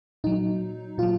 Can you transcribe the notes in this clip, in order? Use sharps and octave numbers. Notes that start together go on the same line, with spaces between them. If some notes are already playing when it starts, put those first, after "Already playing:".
A#2 F#3 D#4
A#2 F#3 F4